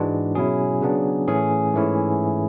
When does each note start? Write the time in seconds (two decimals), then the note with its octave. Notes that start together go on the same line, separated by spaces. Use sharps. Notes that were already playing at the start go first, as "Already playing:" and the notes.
Already playing: G#2 E3 G#3 D4 F#4
0.35 B2 F#3 C#4 E4 G#4
0.82 C#3 F#3 B3 D4
1.27 A2 E3 A3 C#4 G#4
1.74 G#2 E3 A3 C#4 E4